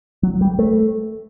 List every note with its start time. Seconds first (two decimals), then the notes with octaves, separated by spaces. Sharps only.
0.23 F#3
0.41 G3
0.59 A3